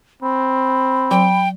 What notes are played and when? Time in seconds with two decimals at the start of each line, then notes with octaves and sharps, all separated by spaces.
0.23 C4 B5
1.11 F#3 G5